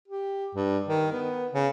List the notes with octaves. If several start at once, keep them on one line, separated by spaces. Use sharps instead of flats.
G4
G2
D#3
B3
C#3